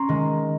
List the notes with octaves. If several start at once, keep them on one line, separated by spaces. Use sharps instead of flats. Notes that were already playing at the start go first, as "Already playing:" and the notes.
Already playing: C#4 A#5 C6
D#3 G#3